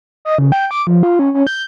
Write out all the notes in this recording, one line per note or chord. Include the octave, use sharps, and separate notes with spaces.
D#5
C#3
G5
D6
F3
F4
C#4
C#4
G6